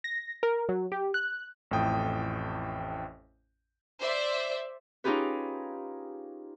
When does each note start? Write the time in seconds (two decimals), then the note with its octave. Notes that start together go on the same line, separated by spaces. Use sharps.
0.04 A#6
0.43 A#4
0.69 F#3
0.92 G4
1.14 F#6
1.71 A1 F2 A2 G5 D#6
4.00 C5 D5 E5
5.04 C#4 D#4 F4 G4 G#4 B4